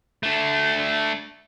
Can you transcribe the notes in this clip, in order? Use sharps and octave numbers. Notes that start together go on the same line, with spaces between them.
A3 D4